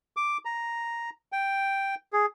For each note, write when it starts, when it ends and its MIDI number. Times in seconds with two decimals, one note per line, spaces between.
0.17 0.37 86
0.45 1.10 82
1.32 1.95 79
2.13 2.26 68